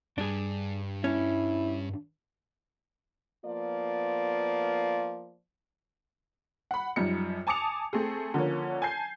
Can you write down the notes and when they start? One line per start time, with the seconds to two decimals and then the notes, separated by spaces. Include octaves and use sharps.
0.18 G2 D4 G#4
1.04 C#4 E4
3.45 F3 A#3 B3 F4 D5
6.71 F#5 B5
6.96 F#2 F3 G3 D#4 C#7
7.47 G#5 A5 D6 D#6 C#7 F7
7.93 A3 C4 G#4
8.34 D3 F3 A#3 C#4
8.82 G#5 A5 G6 C7